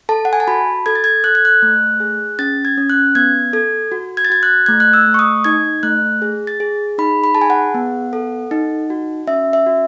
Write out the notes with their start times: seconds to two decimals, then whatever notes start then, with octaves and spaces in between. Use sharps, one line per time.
0.09 A4 A5
0.25 F#5
0.33 G#5
0.40 A5
0.47 F#4 B5
0.86 A4 G#6
0.95 A6
1.04 G#6
1.24 A4 F#6
1.35 G#6
1.45 F#6
1.62 A3
2.00 G#4
2.39 C#4 A6
2.65 G#6
2.78 C#4
2.90 F#6
3.15 B3 G#6
3.53 A4 G#6
3.92 F#4
4.17 G#6
4.25 A6
4.30 F#4 G#6
4.43 F#6
4.66 A3 G#6
4.80 F#6
4.93 E6
5.07 A3
5.14 C#6
5.19 D#6
5.44 D#4 G#6
5.83 A3 F#6
6.22 G#4
6.47 A6
6.60 G#4
6.98 D#4 B5
7.24 B5
7.35 G#4 A5
7.41 G#5
7.50 F#5
7.74 B3
8.13 A4
8.51 D#4
8.90 F#4
9.27 C#4 E5
9.53 E5
9.67 F#4